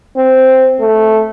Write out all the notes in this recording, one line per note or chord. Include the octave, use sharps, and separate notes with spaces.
C4
A3